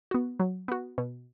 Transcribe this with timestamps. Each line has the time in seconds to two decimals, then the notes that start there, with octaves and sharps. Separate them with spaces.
0.11 B3 F#4
0.40 F#3
0.68 B3 F#4
0.98 B2